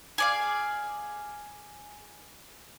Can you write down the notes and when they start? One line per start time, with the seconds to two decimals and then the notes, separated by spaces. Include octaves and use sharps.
0.18 G#4 D5 F5